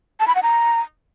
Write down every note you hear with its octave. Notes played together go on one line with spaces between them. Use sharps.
A5
B5
F#5
A#5